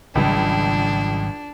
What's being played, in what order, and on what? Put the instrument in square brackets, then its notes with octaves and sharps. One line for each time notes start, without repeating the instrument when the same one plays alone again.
[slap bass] G#1 F#3 G3 [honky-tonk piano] C#2 [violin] D4